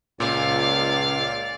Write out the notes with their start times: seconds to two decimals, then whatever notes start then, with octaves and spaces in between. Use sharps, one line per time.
0.20 C#2 A#2 D5 F5